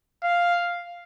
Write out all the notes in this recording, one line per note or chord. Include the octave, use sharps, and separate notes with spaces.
F5